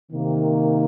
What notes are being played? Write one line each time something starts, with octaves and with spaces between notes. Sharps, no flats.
C3 D#3 A#3